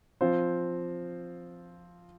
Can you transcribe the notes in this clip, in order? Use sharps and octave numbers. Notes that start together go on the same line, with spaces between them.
F3 C4 F4 C5